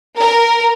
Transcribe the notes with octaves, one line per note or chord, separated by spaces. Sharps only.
A#4